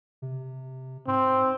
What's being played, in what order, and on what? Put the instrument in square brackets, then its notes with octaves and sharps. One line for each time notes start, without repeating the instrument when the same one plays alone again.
[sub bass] C3
[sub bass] G#2 [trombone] C4